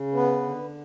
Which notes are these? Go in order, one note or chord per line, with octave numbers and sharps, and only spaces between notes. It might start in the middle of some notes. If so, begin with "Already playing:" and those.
Already playing: C#3
B3 B4
D3